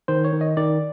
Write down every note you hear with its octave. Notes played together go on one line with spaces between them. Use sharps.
D#3 C5
C#5
D#3
D#5
D#3 D5